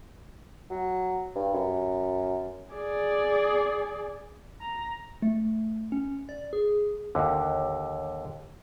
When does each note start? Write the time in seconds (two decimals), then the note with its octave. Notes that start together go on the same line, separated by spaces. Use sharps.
0.71 F#3
1.36 G2
1.54 F#2
2.72 G#4 D5
4.61 A#5
5.22 A3
5.92 C#4
6.29 D5
6.53 G#4
7.15 D#2 D3